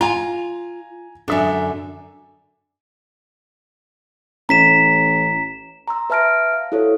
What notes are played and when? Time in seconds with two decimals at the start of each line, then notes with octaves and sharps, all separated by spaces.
0.01 F4 G#5 A#5
1.28 F#2 D3 D4 E5
4.49 A1 A#5 B6 E7
5.88 A#5 C6 E6
6.10 B4 E5 A5 F6 A#6 D7
6.53 F5
6.72 E4 F#4 A4 C5 C#5